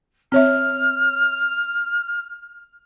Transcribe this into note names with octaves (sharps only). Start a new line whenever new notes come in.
C4 C#5 E5 F6